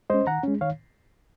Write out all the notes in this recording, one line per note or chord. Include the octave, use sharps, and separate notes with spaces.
G#3 C#4 C5 D#5
D#3 F#5 A#5
G#3 C#4
D#3 C#5 F5